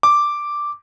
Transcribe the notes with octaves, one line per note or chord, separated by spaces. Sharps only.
D6